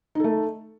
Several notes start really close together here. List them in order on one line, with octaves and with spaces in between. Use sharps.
D#4 A4 A3